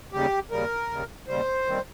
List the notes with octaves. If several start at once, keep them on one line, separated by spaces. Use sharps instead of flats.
D#2 C#3 G3 G4
D#2 C#3 G3 A#4
D#2 C#3 G3
D#2 C#3 G3 C5
D#2 D#3 G3 C4